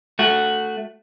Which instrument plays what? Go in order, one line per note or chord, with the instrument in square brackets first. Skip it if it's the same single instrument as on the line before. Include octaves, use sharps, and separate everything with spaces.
[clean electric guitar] A3 F#4